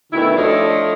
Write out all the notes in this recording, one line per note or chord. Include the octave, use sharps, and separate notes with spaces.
D2 B2 D#3 E4
F3 A3 D4 A4 C#5 D#5